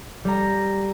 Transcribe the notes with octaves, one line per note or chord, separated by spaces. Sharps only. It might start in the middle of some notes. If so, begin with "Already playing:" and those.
G3 A#5